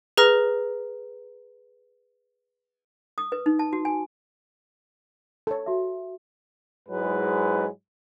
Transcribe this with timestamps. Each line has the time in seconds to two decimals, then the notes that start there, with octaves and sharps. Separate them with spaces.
0.17 G#4 B4 A#5 F6 A#6
3.18 D#6
3.32 B4
3.46 D#4
3.59 A5
3.73 F#4
3.85 G#5
5.47 A4 C#5
5.66 F#4 E5
6.88 G#2 F#3 G#3 E4 B4